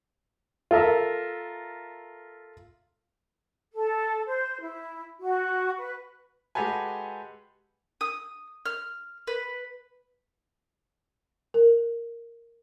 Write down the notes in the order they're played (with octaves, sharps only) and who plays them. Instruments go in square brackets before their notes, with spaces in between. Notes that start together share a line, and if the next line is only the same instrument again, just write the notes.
[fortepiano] F4 A4 A#4 E5
[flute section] A4
C5
E4
F#4
B4
[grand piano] G#3 F#4 G4 A4 B4 G#5
[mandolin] D#6
F6
B4
[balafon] A#4